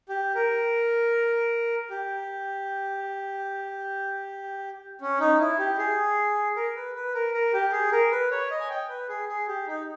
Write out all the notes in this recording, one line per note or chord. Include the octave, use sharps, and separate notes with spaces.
G4
A#4
G4
C#4
D#4
E4
G4
G#4
A#4
B4
B4
A#4
A#4
G4
G#4
A#4
B4
C#5
D#5
G#5
G5
B4
G#4
G#4
G4
D#4